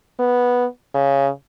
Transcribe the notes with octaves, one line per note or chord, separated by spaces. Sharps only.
B3
C#3